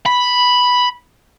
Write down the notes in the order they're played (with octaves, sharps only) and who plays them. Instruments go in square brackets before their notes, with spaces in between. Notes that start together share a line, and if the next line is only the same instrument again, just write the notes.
[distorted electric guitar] B5